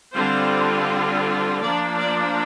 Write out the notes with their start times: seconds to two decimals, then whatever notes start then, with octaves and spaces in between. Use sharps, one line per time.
0.13 D3 G3 C4 F4 C5
1.62 F3 A#3 D4 D5
1.99 D5